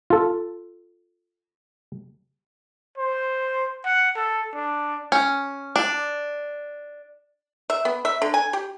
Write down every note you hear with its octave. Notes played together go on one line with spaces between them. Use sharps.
F4 A4
C5
F#5
A4
D4
C#4
D4
E5
B3
E5
D3
G#5
G4